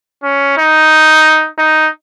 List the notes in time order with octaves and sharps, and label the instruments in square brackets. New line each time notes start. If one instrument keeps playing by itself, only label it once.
[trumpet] C#4
D#4
D#4